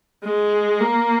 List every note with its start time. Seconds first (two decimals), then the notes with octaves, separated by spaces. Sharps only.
0.24 G#3
0.80 A#3